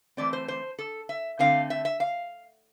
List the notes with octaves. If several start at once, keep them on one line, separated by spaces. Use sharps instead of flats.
E3 A3 C4 D5
C5
C5
A4
E5
D3 A3 C4 F5
E5
E5
F5